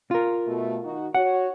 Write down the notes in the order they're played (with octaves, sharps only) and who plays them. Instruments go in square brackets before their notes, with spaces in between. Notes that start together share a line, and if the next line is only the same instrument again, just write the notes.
[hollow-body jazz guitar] F4 A#4
[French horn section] B2 A3
D#3 D#4 F#4
[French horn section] F#4 C#5 [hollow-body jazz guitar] F#5